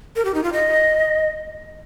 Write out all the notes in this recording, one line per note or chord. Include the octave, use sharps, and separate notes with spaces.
A#4
G4
D#4
F4
D#5